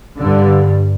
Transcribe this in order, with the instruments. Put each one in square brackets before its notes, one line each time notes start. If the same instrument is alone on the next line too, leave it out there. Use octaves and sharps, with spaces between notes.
[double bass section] G2 D3